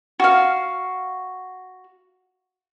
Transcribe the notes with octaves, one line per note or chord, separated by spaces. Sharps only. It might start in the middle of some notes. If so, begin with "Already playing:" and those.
F#4 F5